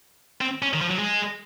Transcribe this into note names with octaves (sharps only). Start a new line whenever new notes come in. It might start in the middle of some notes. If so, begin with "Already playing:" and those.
C4
C#4
D#3
F3
F#3
G#3